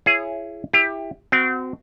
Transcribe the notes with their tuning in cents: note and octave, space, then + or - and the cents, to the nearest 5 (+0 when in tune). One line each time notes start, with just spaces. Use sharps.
E4 +30 G#4 +0 C#5 +0
E4 +0 G4 +20
C4 -30 F#4 +0